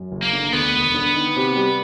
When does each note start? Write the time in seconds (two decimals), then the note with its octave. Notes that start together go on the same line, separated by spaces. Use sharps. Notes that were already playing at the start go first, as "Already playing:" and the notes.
Already playing: F#2
0.12 F#1
0.22 A#3
0.33 D3
0.53 D2 B3
0.74 E1
0.94 D3
1.15 D#3
1.36 C3
1.56 G3